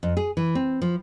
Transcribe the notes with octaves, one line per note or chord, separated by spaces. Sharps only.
F2
G#4
E3
C4
F3